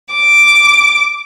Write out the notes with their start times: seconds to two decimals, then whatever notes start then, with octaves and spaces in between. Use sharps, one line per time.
0.14 D6